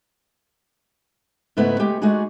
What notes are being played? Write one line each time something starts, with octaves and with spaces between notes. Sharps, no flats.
G#2 C#3 A3 B3 E4
G#3 A3 G4 G#4
G#3 A3 D4 D#4 F#4 G#4